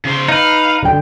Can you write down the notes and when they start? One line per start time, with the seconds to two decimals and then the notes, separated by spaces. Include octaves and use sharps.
0.05 C#3 C5
0.28 D#4 B4 F5
0.83 D3 G5